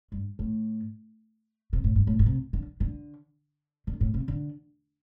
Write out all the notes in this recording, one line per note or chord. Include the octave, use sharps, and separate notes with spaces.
G2
A2
C3
A2
G2
A2
A2
C3
D3
D3
D3
A2
C3
D3